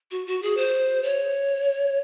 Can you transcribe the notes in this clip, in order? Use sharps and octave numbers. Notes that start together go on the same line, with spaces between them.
F#4
F#4
G#4
C5
C#5